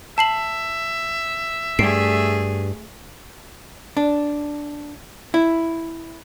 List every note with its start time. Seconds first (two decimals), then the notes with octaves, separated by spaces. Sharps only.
0.18 E5 A5 C7 F#7
1.79 G2 A3 G#4 C7 D7
3.97 D4
5.34 E4